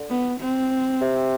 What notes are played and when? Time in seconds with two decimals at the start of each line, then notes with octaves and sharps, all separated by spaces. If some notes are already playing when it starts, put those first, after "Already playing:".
Already playing: D3
0.10 B3
0.41 C4
1.01 C3